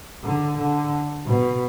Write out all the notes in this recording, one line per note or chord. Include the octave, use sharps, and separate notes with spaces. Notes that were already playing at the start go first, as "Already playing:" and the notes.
D3
D3
B2